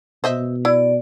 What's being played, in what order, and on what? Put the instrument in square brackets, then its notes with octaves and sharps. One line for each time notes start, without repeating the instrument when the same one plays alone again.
[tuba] B2 [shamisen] C5 D#5 E5
[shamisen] E4 [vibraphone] D5